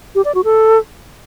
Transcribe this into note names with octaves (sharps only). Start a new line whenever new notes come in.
G4
D5
F#4
A4